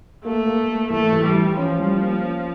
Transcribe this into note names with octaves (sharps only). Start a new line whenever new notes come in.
A3 A#3
A#3
A#3
E3 A3
E3
G3
E3
F3 C#4
G3
A#3
C#4